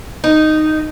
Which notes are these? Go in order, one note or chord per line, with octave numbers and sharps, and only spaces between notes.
D#4